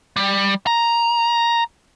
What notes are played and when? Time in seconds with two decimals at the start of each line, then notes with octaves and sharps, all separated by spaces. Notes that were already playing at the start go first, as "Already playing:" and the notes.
0.16 G3
0.67 A#5